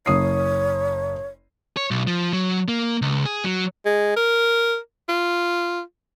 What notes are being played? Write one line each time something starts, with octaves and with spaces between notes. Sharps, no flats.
F#1 C#5 D#6 C7
C#5
B1
F3
F#3
A#3
C#2
G#4
F#3
G#3
A#4
F4